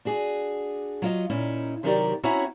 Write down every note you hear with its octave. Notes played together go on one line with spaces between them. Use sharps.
D4 F#4 G#4
F#3 F4 D#5
A#2 C#4 D#4 E4
C3 D#3 F#3 G4 A#4 D5
C4 C#4 E4 F#4 C#5 A#5